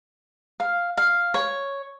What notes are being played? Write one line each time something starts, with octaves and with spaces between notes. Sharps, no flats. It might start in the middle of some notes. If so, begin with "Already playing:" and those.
F5
F5
C#5